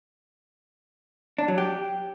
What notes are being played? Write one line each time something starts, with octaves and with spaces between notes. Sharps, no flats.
D4
F#3
G4